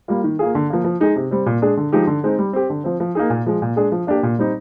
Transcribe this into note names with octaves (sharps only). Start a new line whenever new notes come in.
G3 A#3 F4
D#3
A#3 F4 G#4
D3
F3 A#3
F3
G#3 D#4 G#4
C3
G3 C4
A#2
G#3 D4 G#4
D3
F3 G#3 D#4 G4
D3
G#3 C4 D#4
G3
C4 G4
D3
F3 C4
F3
A#3 D#4 G#4
A#2
F3 G#3
A#2
G#3 D4 G#4
F3
A#3 D4 G4
A#2
G3 C4 D#4